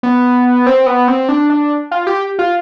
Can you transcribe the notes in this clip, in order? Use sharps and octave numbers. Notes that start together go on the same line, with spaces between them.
B3
C4
B3
C4
D4
D4
F4
G4
F4